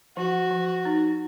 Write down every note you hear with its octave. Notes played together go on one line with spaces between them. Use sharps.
F3 F#4
F3
D#4